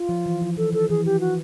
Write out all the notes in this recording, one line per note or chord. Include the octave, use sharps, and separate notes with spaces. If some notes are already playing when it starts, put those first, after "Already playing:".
Already playing: F4
F3
E3
F3
E3 A4
D#3 A4
E3 G#4
F3 G4
F#4